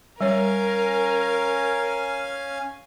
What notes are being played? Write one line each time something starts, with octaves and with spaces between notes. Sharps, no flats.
G3 C#4 A#4 C#5 F5 G#5